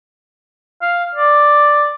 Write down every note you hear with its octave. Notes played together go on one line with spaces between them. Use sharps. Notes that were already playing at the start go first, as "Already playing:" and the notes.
F5
D5